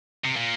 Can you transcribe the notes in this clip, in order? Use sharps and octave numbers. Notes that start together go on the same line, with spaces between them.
C3
A#2